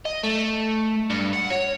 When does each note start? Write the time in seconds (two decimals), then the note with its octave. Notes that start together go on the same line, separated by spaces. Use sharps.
0.05 D#5
0.23 A3
1.10 G2
1.33 F#5
1.50 C#5